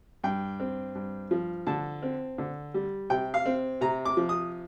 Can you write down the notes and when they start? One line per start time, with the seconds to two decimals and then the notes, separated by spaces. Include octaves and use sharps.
0.24 G2 G5
0.60 C4
0.95 G2
1.31 F3
1.67 D3 A5
2.02 C4
2.38 D3
2.74 G3
3.10 C3 G5
3.34 F5
3.46 C4
3.81 C3 A#5
4.05 D6
4.17 F3
4.29 D#6